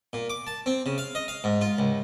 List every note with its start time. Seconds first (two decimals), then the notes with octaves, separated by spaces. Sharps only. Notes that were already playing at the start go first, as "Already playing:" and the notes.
0.13 A#2
0.30 D6
0.47 A5
0.66 C4
0.86 C#3
0.98 F5
1.15 D#5
1.28 F5
1.44 G#2
1.61 F4
1.78 C#2